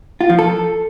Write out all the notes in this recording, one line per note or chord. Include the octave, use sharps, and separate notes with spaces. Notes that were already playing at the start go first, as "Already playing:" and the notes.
F4
F3
A4